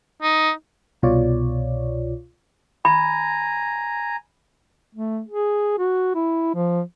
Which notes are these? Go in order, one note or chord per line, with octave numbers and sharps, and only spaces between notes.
D#4
C2 B2 F4 C#5 D5
G#5 A#5 B5
A3
G#4
F#4
E4
F3